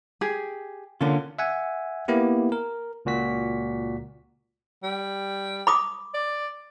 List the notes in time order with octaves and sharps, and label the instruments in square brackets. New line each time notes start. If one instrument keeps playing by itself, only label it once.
[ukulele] G4 G#4
[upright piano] D3 [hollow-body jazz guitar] A#3 C#4 F4
[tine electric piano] E5 F#5 G#5
A#3 B3 E4 G4
A#4
C#2 A#2 F#4 B6
[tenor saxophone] G3
[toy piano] B5 D6 D#6
[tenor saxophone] D5